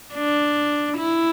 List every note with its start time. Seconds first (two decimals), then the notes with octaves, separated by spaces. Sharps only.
0.13 D4
0.97 E4